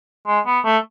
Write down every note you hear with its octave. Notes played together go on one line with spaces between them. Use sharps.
G#3
B3
A3